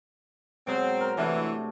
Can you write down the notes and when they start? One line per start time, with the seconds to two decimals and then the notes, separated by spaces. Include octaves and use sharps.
0.67 B2 F#3 G#3 C4
1.00 A#4
1.17 C3 E3 A3 D4